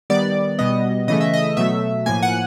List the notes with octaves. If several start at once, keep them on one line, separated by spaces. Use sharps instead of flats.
D#3 G3 B3 D5
B2 G3 B3 D#5
C#3 E3 A3 D#5
E5
D#5
B2 F#3 A3 E5
A2 F3 A#3 G#5
F#5